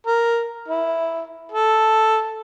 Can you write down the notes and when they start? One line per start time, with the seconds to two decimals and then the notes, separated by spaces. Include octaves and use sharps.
0.06 A#4
0.68 E4
1.51 A4